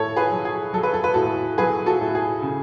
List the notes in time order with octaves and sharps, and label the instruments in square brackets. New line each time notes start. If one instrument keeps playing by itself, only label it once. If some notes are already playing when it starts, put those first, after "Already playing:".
Already playing: [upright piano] A2 A4 C#5 A5
G#4 B4
F#3
G#4
F#3 A4
B4
A4
B4
A2 F#4 A4
F#3 G#4 B4
F#4 A4
A2
G#4
C#3